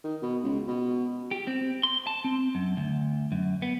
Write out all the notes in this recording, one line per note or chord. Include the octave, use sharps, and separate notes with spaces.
D#3
B2
C#2
B2
G4
C4
C6
A5
C4
F#2
D2
F#2
B3